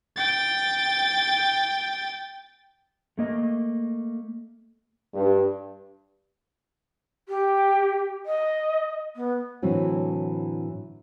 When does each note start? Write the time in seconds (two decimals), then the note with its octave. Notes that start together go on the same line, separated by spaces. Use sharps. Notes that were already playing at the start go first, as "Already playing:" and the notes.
0.16 G5 A6
3.18 A3 A#3 D#5
5.14 G2
7.28 G4
8.26 D#5
9.16 B3
9.62 A2 D3 E3 F#3 C4